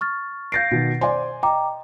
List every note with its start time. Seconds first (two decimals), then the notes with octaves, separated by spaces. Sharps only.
0.01 C#6 F6 A6
0.52 F5 G6 A6 A#6 C7 D7
0.71 B2 D#3
1.01 C5 D5 G#5 C6
1.43 D#5 G5 A#5 D6